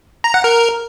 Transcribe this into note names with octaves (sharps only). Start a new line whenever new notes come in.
A#5
F#5
A#4